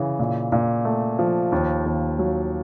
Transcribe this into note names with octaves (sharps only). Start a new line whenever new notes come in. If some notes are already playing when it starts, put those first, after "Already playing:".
Already playing: C#3 E3
A#2
A#2
A3
F3
D#2
D#2
F#3